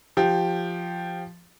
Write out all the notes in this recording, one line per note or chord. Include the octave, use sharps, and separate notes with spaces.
F3 G4